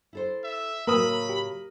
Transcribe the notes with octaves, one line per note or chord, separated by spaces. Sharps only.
E4 A4 C5
E5
A2 C#3 F#3 A#3 A#4 B5 D#6 E6
G4